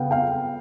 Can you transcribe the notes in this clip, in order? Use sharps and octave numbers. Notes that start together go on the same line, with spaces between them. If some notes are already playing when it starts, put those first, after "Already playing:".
Already playing: C#3 B3 F5 G5
F5 G5